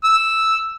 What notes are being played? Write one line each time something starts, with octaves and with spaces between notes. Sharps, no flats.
E6